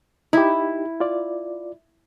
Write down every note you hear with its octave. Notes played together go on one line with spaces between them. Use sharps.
D#4 E4 G4
F4 D5